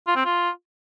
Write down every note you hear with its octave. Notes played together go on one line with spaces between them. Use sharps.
F4
C4
F4